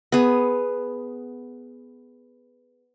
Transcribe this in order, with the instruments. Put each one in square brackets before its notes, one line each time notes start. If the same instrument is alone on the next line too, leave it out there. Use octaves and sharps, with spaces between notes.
[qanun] B3 G#4